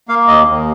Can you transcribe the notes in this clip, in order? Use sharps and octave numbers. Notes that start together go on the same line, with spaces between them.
A#3 F5
D#2 D#5
D#2